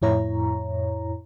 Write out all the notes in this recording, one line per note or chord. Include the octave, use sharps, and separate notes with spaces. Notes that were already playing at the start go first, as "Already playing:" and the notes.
F2 A2 E4 C#5 A#5